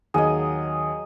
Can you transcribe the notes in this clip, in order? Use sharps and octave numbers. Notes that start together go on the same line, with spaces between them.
D#2 F#3 G#4 D#5